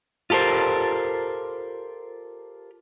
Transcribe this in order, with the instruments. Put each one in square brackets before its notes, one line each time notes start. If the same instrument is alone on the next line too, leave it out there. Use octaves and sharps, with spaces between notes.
[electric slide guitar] F4 G4 A4 A#4 C5